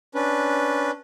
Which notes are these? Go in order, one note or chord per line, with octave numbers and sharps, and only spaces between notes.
C#4 D4 B4